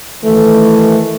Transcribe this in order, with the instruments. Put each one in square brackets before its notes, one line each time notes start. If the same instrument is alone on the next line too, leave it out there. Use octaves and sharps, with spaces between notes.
[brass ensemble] D#3 E3 A3